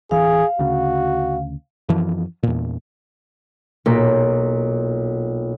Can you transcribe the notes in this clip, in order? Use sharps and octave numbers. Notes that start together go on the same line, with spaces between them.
D1 E3 G#4 F5
D2 C#3 F#4
F#2 E3 F3
E2 A#2
B1 A#2 A#6 B6